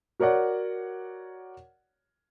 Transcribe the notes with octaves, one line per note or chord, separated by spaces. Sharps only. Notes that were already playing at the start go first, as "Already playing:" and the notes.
F#4 A#4 C#5 D5 F#5